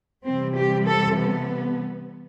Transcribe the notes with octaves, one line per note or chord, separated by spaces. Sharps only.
C3 E3 G3 C4
G4
A4
B3